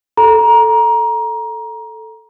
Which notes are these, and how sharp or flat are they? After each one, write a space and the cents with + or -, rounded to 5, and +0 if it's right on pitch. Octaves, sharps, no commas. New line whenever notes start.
A4 +0 A#5 +20